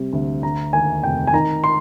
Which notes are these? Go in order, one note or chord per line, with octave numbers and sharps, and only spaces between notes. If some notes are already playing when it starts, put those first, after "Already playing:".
Already playing: C3 G3
D2
D3 A#5
D#2 G#5
F1 G5
G#5
D#3 A#5
C6